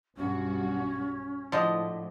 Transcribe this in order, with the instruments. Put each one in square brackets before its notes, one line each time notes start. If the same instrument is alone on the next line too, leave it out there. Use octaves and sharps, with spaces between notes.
[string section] B1 G2 F#4 [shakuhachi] C#4
[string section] A2 [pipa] D3 G#3 D#5 [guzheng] F3